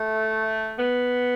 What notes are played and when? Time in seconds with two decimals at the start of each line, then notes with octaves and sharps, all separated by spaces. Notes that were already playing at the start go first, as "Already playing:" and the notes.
Already playing: A3
0.79 B3